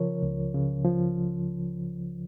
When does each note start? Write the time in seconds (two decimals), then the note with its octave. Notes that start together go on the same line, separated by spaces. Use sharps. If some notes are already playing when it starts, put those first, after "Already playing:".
Already playing: C#3 F3 A#4 C#5
0.22 C#2
0.54 C#3
0.84 F3